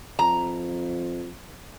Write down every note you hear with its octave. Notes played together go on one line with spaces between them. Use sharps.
F2 A#5